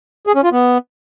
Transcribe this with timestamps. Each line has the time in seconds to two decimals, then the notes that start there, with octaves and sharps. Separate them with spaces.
0.27 G#4
0.35 C#4
0.44 F4
0.52 B3